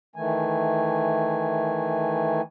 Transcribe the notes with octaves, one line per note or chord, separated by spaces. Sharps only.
D#3 E3 A3 G#5